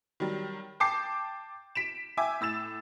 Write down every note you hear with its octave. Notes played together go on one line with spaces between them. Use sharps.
D#3 F#3 G3
G5 A5 D6 G6 C7
B6 D7 E7
E5 G5 G#5 D6
A2 E6 A6 E7